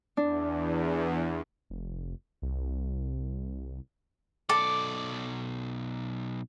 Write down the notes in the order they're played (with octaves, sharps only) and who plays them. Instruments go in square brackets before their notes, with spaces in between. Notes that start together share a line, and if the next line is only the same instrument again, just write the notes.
[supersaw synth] E2 [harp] D4
[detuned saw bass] F1
C2
[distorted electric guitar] B1 D5 [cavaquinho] A4 D6